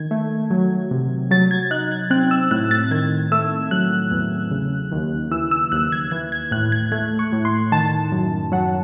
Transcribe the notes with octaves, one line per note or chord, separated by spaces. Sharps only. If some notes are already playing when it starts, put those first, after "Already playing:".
Already playing: D#3 G#6
A3
F#3
C3
F#3 A6
G#6
D#4 F#6
G#6
C4 F#6
E6
A2 F#6
A6
D#3 G#6
A3 E6
F#3 F#6
E2
C#3
D#2
E3 E6
E6
D#2 F#6
G#6
E3 G#6
G#6
A2 F#6
G#6
A3 G#6
C#6
A2
C6
D#3 A5
F#2
F#3 F#5